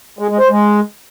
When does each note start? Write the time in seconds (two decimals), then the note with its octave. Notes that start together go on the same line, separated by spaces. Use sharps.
0.19 G#3
0.29 G#3
0.39 C5
0.49 G#3